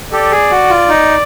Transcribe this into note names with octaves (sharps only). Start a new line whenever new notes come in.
G4 A4 D5
G#4
F#4
F4
D#4